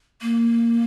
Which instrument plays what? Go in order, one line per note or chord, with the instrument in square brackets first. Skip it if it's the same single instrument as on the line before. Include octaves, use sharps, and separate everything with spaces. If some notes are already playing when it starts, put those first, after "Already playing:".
[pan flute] A#3